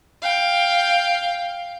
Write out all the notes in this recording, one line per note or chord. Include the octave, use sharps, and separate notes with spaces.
F5 G5